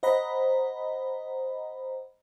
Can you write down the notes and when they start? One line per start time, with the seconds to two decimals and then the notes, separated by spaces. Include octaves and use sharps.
0.03 C5 D#5 F#5 A#5 B5